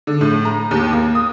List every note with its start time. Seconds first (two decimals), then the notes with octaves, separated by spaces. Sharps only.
0.07 D3
0.21 A2
0.45 A#5
0.71 D#2
0.93 A#3
1.15 D#6